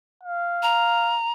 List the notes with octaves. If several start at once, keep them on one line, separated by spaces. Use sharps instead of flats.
F5
A#5